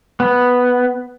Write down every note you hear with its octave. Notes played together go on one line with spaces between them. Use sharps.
B3